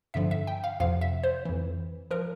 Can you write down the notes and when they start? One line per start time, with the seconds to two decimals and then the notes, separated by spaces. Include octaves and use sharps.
0.14 G2 D3 F3 E5
0.31 E5
0.47 G5
0.64 F5
0.80 F2 C3 F3 F5
1.01 E5
1.23 C5
1.45 F2 E3
2.10 F3 A#4